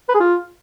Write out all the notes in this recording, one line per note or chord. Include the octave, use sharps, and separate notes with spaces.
B4
G#4
F4